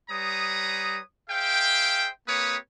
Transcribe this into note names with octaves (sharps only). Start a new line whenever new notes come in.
G3 B4 C#5 A#5 D#6
G#4 C5 E5 F5 G5
A#3 C4 G4 B4 C#5 D#6